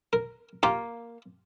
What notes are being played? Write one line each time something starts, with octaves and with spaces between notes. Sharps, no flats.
A#4
A#3 F4 G4